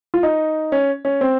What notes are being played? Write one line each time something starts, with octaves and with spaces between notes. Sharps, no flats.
F4
D#4
C#4
C#4
C4